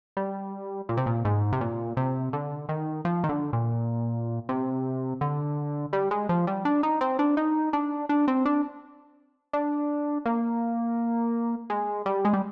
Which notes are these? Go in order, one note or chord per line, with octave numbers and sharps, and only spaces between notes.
G3
A#2
C3
A#2
G#2
C3
A#2
C3
D3
D#3
F3
D#3
D3
A#2
C3
D3
G3
G#3
F3
G3
D4
D#4
C4
D4
D#4
D4
D4
C4
D4
D4
A#3
G#3
G3
G#3
G3